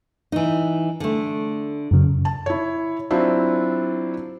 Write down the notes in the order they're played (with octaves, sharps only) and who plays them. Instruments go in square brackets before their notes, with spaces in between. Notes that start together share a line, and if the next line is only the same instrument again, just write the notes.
[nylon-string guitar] E3 D#4
D3 A3
[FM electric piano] F#2 C#3
[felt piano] A5
E4 C#5
F#3 C4 D4 E4 F4